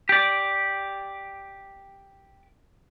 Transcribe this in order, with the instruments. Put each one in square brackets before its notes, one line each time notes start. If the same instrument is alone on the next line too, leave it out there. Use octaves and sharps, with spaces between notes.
[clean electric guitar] G4 D5